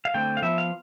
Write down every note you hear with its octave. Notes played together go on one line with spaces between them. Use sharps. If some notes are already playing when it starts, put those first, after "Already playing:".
F5
D3 A3 C4 G5
F5
F3 B3 E5
F5